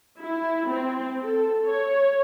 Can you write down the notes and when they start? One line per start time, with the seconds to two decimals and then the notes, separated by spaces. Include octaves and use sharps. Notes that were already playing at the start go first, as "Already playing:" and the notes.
0.19 E4
0.68 C4
1.22 A4
1.65 C#5